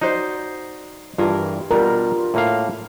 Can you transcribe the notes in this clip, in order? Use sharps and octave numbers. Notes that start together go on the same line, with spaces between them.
D#4 F#4 C5 D5
G2 E3 F4 G#4 A#4
B2 G3 D4 F4 A#4 A#5
A2 A#3 F5